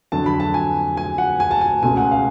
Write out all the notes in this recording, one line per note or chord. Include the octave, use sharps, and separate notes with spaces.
F2 D3 F#3 A5
B5
A5
G#5
G#5
F#5
G#5
A5
G#5
C#2 B2 A3 G#5
F#5
F5